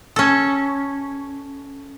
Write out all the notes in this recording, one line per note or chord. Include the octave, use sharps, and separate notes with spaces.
C#4 A4